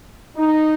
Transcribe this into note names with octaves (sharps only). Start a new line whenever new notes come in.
D#4